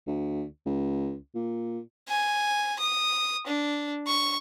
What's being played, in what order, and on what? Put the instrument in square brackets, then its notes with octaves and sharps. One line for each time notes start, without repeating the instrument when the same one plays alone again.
[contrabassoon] D2
C#2
A#2
[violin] G#5
D#6
D4
C#6